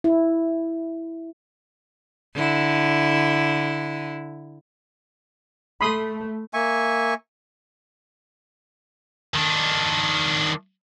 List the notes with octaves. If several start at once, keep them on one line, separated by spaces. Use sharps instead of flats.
E4
D3 E4
A3 B5 C6 D#6
A#3 E5 G#5 C#6
D#3 D4